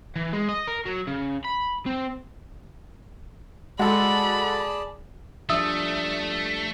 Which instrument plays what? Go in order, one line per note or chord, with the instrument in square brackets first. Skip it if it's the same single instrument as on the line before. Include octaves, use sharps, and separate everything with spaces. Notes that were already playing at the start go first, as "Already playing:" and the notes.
[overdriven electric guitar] E3
G#3
D#5
A#4
F#3
C#3
B5
C4
[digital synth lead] G#3 [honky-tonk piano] F#4 A4 [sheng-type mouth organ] G#4 D5 A5 [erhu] B5
[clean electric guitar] F3 G3 D4 [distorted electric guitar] A3 [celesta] E5 D#6 E6